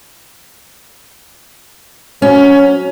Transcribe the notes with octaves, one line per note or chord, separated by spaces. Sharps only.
F#3 C#4